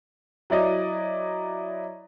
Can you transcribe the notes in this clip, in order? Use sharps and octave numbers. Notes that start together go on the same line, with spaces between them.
F#3 E4 D5 D#5